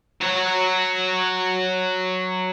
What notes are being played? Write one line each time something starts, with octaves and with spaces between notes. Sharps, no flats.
F#3 C#5